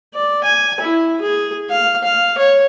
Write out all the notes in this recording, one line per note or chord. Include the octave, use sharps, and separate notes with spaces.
D5
G#5
E4
G#4
F5
F5
C#5